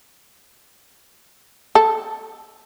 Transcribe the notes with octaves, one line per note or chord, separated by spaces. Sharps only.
A4